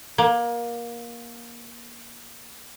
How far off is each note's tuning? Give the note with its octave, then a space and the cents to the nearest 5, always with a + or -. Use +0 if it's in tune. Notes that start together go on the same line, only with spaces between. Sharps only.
A#3 +20